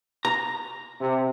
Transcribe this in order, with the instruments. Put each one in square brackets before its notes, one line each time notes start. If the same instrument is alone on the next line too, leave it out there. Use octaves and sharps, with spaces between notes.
[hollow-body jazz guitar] A#5
[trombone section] C3